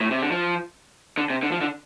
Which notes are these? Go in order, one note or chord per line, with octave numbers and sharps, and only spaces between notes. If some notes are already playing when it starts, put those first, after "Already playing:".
A2
C3
D3
F3
D3
C3
D3
F3
D3